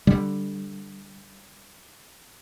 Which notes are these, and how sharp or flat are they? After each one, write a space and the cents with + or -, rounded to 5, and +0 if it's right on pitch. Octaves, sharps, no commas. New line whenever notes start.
D3 +0 G3 +0